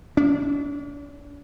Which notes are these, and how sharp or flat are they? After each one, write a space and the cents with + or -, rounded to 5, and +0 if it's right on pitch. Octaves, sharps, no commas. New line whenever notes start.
D4 -45